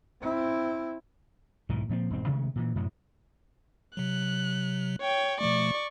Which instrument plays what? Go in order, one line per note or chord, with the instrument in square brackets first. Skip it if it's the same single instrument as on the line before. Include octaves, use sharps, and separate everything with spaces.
[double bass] C4 E4
[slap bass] B1 G#2 D#3 E3
A#2 F3 G#3 C4
E1 G#2 C4
C3 D#3 G#3 A3
A#2 E3
F#2 A2 C3 F#3
[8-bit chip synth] C3 F#3 [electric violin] F#6
[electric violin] C#5 G5
[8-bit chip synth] B2 F3 A3 [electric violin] D5 C#6